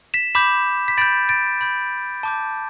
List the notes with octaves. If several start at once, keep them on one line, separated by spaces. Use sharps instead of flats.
B6 E7
B5 D6 G6 B6 E7
B6
B5 G6 A6 D7
A6 D7
B5 G6
A5 D6 G6